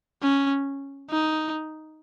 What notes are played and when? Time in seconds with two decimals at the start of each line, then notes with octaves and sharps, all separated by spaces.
0.23 C#4
1.11 D#4